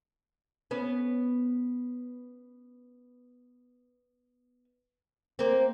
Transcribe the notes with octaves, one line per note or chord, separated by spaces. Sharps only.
B3 C#4
A#3 C4